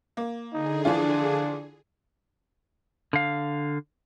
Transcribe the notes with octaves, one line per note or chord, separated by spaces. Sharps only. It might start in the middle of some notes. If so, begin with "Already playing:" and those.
A#3
D3 D#4 G#4
E3 F3 D4 F4
D3 F5